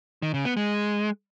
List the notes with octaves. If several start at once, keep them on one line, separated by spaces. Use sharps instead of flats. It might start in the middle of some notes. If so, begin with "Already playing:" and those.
D#3
C#3
B3
G#3